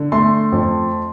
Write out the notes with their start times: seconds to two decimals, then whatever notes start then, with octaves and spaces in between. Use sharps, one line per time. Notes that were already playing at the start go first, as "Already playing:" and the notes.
Already playing: D3
0.12 A3 C6
0.52 F2